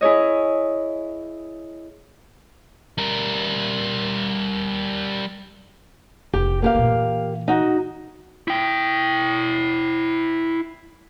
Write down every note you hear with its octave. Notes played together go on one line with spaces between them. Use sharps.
E4 G#4 C#5 D#5
G3 A#4
F1 G4
A#3 G4 F5
A#2 E3
D#4 F#4
E4 G5